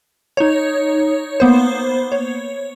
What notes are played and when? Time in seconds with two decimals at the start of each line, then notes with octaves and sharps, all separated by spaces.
0.37 D#4 C#5
1.40 A#3 B3 C5
2.12 C#5